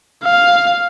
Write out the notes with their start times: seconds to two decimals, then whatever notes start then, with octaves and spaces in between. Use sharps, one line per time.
0.24 F5